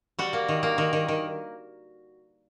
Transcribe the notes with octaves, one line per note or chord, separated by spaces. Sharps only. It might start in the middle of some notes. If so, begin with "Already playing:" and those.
G3 F#4
A#3
D#3
A#3
D#3
D#3
D#3